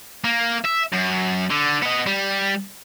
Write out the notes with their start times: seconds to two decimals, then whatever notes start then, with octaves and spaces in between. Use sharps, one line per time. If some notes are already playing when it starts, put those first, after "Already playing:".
0.24 A#3
0.64 E5
0.93 F#2
1.50 D3
1.82 B3 D#5
2.07 G3